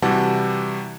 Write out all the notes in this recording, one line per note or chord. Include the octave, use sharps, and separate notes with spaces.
C3 E3 G3 F#4 F#5 A5